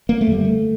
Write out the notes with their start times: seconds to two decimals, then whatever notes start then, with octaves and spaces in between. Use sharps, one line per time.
0.09 A#3
0.21 A3
0.27 F#2 D3 G3
0.45 A3